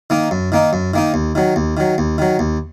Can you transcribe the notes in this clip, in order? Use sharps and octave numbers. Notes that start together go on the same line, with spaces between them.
D#3 A#3 D#4
F#2
D#3 A#3 D#4
F#2
D#3 A#3 D#4
D#2
D#3 F#3
D#2
D#3 F#3
D#2
D#3 F#3
D#2